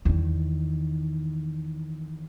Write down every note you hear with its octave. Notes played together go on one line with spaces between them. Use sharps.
E2 D#3